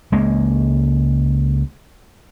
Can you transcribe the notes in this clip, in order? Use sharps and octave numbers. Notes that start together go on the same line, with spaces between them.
C#2 G#3 A#3